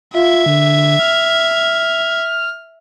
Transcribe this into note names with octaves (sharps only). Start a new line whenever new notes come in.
F4 E5 G#6
D3
F6